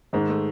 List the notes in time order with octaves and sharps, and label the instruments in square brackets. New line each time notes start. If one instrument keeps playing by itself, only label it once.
[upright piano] G#2 G#3 [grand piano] D#3
[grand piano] A3